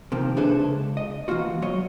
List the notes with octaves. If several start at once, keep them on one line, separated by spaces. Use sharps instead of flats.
C3 D#3 F3 A#3
D4 E4 G#4 A4 B4 C5
C#2
D#5
E3 F3 A#3 F4 F#4
F#3 C#5 D#5